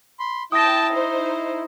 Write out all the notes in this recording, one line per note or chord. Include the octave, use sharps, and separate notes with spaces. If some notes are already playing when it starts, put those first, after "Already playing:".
B5 C6
E4 G5 A5 D#6 A#6
D#4 C5